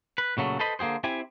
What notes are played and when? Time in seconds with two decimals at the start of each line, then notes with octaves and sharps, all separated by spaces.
0.18 B4
0.37 A#2 C#3 F#3 A3
0.60 A4 B4 C5 D#5 B5
0.79 D3 A#3 G4 G#4 C5
1.04 C4 E4 G4 G#5